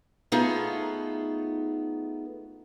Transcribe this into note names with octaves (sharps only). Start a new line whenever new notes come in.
A3 B3 D#4 F4 G#4 A4